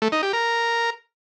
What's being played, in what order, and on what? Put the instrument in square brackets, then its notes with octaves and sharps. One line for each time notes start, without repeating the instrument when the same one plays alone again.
[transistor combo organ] A3
D#4
G4
A#4